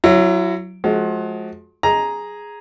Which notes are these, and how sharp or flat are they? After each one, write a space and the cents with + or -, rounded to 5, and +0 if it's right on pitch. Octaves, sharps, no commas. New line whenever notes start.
F#3 +0 E4 +30
F3 +25 G#3 +40 F#4 +15
G#4 +0 A#5 +5